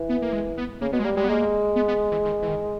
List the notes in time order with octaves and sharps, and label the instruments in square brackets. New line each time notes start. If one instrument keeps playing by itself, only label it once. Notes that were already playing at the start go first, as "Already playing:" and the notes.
Already playing: [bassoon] E3
[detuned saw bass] B3
A#3
G#3
B3
[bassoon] C#3 [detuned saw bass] A#3
[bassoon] B2 [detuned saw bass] B3
[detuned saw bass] G#3
[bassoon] G3 [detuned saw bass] A#3
[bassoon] G3 [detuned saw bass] G#3
[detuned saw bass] B3
[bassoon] G#3 [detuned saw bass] A#3
[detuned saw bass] B3
B3
E3
D#3
E3
D#3